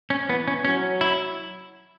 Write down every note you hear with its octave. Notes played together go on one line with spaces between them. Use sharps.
C#4
E3 B3
C#4
F#3 C#4
E4